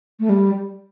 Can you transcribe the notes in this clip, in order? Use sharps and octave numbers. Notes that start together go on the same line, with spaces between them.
A3
G3